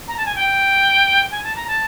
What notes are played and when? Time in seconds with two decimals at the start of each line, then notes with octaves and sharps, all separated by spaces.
0.08 A#5
0.17 A5
0.26 G#5
0.36 G5
1.31 G#5
1.44 A5
1.56 A#5
1.68 A5